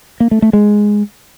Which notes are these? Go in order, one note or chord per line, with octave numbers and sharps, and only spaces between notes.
A#3
A3
A3
G#3